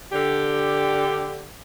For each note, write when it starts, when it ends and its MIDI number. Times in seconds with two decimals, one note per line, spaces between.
0.12 1.48 50
0.12 1.48 67